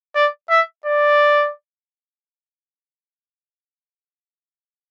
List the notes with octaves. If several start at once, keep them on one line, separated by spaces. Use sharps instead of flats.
D5
E5
D5